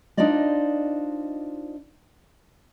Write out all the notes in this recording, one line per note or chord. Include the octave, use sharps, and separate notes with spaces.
D4 D#4 F4 C5 D5 D#5